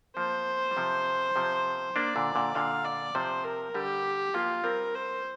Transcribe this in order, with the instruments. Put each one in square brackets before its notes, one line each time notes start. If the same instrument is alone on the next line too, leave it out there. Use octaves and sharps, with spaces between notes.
[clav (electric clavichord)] F3 A#3 [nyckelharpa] C5
[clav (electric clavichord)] G3
C3 F3
C3 F3
[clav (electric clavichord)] A#3 D4 [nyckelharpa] D5
[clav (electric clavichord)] A#2 D3
A#2 D3
[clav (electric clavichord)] A#2 D3 [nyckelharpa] F5
[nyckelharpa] D5
[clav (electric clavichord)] C3 F3 [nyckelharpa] C5
[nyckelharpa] A#4
[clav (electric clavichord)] D3 G3 [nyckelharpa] G4
[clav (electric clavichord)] F3 A#3 [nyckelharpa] F4
[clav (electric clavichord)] G3 C4 [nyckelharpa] A#4
[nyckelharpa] C5